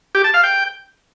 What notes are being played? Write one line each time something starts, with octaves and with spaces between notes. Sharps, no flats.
G4
A5
F5
G5